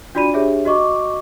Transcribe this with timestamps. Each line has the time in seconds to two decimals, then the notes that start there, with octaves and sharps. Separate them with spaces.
0.15 D4 F4 F#4 D5 B5 D#7
0.34 D4 G4 G#4 C#5 E5
0.65 F#4 D#5 C#6 D6